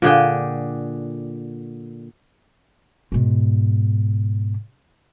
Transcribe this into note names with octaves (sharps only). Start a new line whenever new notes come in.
A#2 D3 G#4 G5
G#2 B2